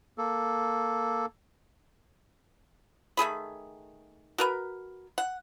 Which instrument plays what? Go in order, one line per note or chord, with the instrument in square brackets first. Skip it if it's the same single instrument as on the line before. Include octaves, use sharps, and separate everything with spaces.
[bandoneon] A#3 A4
[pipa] D#3 A3 G#4 B5
F#4 A#4 B4
F#5